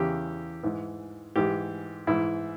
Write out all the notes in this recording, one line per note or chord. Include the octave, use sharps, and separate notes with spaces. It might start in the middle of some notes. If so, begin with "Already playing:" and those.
Already playing: E2 C#3 E3 G4
G#2 E3
G#2 E3 G4
G#2 E3 E4